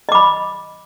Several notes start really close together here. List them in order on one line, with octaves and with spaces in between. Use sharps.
D#5 D6 B5